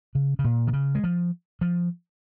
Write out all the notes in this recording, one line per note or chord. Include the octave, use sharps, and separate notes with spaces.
C#3
C#3
A#2
D#3
C#3
G#3
F3
F3